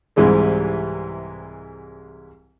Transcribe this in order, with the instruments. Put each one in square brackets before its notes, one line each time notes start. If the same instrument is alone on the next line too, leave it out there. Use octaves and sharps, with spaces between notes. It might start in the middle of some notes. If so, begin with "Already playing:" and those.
[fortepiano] C2 G#2 C3 E3 G3 G#3